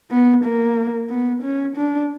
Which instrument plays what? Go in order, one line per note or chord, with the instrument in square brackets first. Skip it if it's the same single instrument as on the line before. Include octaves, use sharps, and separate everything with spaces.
[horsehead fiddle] B3
A#3
B3
C#4
D4